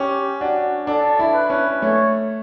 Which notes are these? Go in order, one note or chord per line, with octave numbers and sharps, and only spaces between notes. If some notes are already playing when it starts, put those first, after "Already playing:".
Already playing: C#4 G4
D4 F#4
D4 A4
E4
B4
C#4
A3 C#5